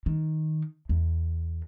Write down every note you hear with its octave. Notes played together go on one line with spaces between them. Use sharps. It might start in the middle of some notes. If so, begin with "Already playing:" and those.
D#3
E2